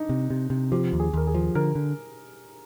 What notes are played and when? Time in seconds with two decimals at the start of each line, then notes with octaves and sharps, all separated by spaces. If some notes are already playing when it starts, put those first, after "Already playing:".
Already playing: D4 D#4
0.09 C3
0.30 C3
0.50 C3
0.72 F3 G4
0.93 D#2
1.00 G#4
1.13 D#2 A#4
1.27 G#4
1.34 F3
1.55 D3 A#4
1.75 D3